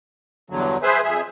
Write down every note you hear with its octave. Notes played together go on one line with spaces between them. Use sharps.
E2 G2 D3 F#3
G#4 B4 C5 E5
F2 G#4 E5